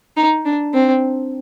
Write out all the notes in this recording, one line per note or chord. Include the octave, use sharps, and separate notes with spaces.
D#4
D4
C4